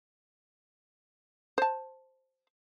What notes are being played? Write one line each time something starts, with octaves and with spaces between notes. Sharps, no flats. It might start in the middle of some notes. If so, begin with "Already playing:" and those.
C5 A5